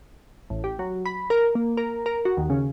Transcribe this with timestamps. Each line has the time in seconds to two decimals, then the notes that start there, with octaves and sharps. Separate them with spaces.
0.50 A1
0.64 G4
0.79 F#3
1.05 B5
1.30 A#4
1.55 A#3
1.77 A#4
2.06 A#4
2.25 F#4
2.37 D#2
2.50 C#3